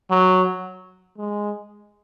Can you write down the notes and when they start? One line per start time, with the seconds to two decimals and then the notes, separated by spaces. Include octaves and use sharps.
0.10 F#3
1.18 G#3